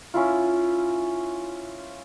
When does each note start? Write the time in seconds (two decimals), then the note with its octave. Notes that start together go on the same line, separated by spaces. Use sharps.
0.14 C#4 E4 F4